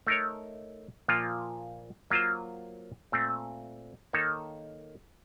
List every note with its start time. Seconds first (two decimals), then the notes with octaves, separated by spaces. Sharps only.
0.07 A3 D#4 A#4 C#5
1.08 A#2 F3 A#3 F4
2.10 F#3 A#3 F4 C5
3.12 A#2 A3 C4
4.13 D#3 A#3 D#4 A4 C#5